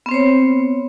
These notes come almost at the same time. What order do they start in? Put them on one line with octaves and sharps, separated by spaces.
B3 C4 C5 C#5